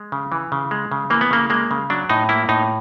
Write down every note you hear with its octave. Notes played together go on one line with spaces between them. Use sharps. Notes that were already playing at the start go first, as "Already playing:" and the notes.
Already playing: G#3
C#3
E3
C#3
G#3
C#3
E3 A#3
B3
C#3 A#3
G#3 A#3
C#3
F#3 D4
A2 D#4
A#3 E4
A2 D#4